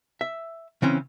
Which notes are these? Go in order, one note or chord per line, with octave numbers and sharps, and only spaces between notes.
E5
C#3 E3 C4 C#4